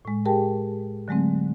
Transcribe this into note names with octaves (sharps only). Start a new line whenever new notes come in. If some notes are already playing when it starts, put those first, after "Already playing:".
A2 G#3
G4 G#4 A#4 G5 A5
D3 F#3 G#3 A3 C4